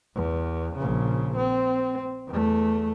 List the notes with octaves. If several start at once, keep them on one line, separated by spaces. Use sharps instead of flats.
E2
A#1 C#3
C4
E2 A3